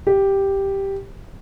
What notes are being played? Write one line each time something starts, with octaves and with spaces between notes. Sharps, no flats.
G4